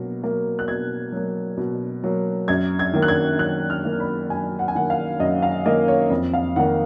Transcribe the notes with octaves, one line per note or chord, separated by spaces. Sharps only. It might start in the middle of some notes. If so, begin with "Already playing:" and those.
Already playing: B2 F#3 A#3
F#3 A#3
F#6
B2 G#6
F#3 A#3
B2
F#3 A#3
F#2 G#6
G#6
D#3 A#3
F#6
G#6
F#2 F#6
F6
D#3 A#3
B5
F#2 G#5
F#5
G#5
D#3 A#3 F#5
F5
F#2 D#5
F5
D#3 A#3 D#5
C#5
F2
F5
D#3 A#3 F#5